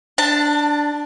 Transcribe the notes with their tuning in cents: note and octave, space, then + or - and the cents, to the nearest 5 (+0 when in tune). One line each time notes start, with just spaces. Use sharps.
D4 +0 A5 +30